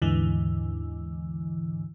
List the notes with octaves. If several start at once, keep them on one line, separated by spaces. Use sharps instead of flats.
D#2 G#2 D3 E3